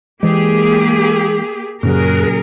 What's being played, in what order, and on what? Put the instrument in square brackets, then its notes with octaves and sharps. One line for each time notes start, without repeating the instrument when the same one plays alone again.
[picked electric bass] E3 G#3 [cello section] A#3 G4 G#4
[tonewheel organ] F#2 [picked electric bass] A#2 C#3 F#3 [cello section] G4 G#4 A#4